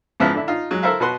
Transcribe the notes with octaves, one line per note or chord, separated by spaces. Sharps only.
G#2 C#3 F3 B3 E4 F4
D3 E4
D#4 F4
F#3 G#3
E4 A4 A#4 C5 E5 F5
B2 F#4 B4 F#5 C6